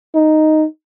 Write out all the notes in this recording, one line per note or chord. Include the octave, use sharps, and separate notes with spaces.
D#4